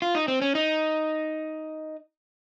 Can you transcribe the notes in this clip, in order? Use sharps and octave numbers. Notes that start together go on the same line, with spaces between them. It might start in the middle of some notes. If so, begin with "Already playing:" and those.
F4
D#4
C4
C#4
D#4